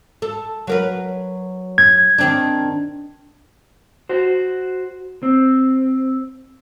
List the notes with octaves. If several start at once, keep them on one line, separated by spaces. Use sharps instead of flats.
A4
F#3 A#4 B4
G#6
D#3 C4 D4
F#4 C5
C4